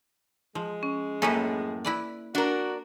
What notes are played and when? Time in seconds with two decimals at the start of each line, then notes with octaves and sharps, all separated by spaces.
0.55 F3 G#3
0.83 C#4
1.22 F#2 A2 A#3 C#4 A4 B4
1.85 E4 B4 D5
2.35 D4 F#4 A#4